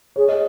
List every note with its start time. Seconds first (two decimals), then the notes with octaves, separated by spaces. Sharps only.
0.16 G#4 C#5
0.29 D#5